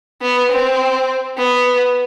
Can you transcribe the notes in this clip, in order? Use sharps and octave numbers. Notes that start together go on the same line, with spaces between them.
B3
C4
B3